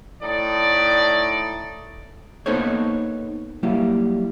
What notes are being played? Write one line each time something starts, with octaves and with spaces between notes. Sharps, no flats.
A2 D#4 D5
A#3 B3 D#4 A4 C5 C#5
F#3 G3 A#3 E4